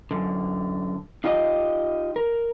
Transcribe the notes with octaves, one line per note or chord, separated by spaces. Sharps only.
F#2 D3
D#4 F4 G4 D#5
A#4